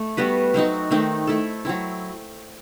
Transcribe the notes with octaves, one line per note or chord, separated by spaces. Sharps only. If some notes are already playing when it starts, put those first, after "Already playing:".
Already playing: A3
G3 B3 F#4 B4
F#3 C4 D#4 F#4
D#3 A3 C4 D#4
A3 E4 A4
F#3 C4 E4